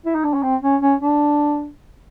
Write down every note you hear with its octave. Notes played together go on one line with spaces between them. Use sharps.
E4
D#4
D4
C#4
C4
C#4
C#4
D4